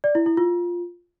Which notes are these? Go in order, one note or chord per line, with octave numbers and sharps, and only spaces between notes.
D5
E4
E4
F4